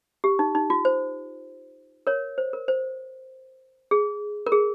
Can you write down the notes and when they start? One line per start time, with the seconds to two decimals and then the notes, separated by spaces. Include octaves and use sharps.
0.24 G4
0.39 D#4
0.55 D#4
0.70 F4
0.85 C5
2.07 A#4 C#5
2.38 C5
2.53 A#4
2.68 C5
3.91 G#4
4.47 A#4
4.52 G#4